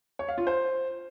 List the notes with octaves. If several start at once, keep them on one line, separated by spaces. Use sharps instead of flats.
C#5
F5
F4
C5